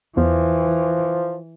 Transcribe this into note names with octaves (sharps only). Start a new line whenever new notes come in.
E2 E3 F3